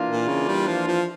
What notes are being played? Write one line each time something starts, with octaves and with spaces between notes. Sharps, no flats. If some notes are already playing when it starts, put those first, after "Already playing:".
Already playing: E3 A#3 D4 F4
A#2
C#3
G3
F3
F3